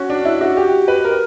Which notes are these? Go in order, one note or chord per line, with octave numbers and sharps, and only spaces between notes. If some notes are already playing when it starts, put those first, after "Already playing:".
Already playing: C#4 F#4
D4
E4
F#4
G4
B4
A#4